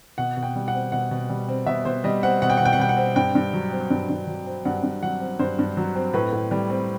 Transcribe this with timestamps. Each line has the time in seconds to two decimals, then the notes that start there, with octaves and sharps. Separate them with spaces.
0.18 B2 F#5
0.37 B2
0.43 G5
0.56 G3
0.68 F#5
0.74 C4
0.92 B2 F#5
1.11 B2
1.29 G3
1.48 C4
1.66 B2 E5
1.85 B2 C5
2.04 G3 D#5
2.23 C4 F#5
2.42 B2 F#5
2.50 G5
2.57 B2 F#5
2.65 G5
2.73 F#5
2.78 G3 G5
2.89 F#5
2.97 C4
3.16 G2 G5
3.35 G2
3.53 F#3
3.72 C4
3.90 G2
4.10 G2
4.27 F#3
4.46 C4
4.65 G2 F#5
4.83 G2
5.02 F#3 F#5
5.20 C4
5.39 G2 C5
5.59 G2
5.77 F#3
5.95 C4
6.14 A2 B4
6.33 A2
6.51 G3
6.70 C4